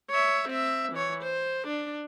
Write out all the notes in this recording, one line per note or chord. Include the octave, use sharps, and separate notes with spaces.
C#5 E5
C4 E5
E3 C#5
C5
D4